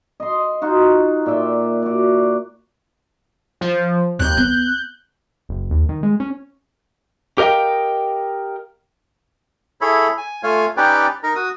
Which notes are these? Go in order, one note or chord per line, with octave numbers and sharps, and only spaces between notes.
D#5 C6
D#4 F4 F#4
A#2 D5 E5 G5
F#4 D5
F3
D#2 F#6 G6
B3
F#1
D#2
D#3
G#3
C#4
G4 A#4 D#5 F5 G5
E4 G#4 A4 C#5 B5
G#5
A3 F4 C#5 F5 G#5
C#4 D#4 G4 B4 D5 G5
D#4 A#4 A#5
F#4 D#6